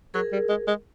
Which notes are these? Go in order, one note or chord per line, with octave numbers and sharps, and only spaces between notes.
F#3 G#4 A#4
G3
G#3
G#3